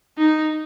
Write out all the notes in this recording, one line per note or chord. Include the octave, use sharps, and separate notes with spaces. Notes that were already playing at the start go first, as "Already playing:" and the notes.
D#4